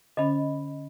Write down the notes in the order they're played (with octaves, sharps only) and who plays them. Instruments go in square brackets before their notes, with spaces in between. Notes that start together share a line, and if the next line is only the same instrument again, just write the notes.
[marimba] D3 C#4 [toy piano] D#5 B5